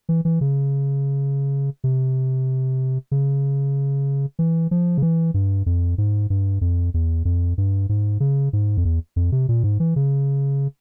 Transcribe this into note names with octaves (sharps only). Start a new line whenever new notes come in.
E3
E3
C#3
C3
C#3
E3
F3
C#3
E3
G2
F2
G#2
G2
F2
E2
F2
G2
G#2
C#3
G#2
F2
E2
F2
C3
A#2
G#2
E3
C#3